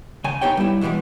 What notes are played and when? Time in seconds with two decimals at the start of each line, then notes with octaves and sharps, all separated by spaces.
0.24 C#3 G#5
0.41 B3 D#4 G4 C#5 G5
0.57 G3 E4
0.81 B2 D3 E3 G3 G#3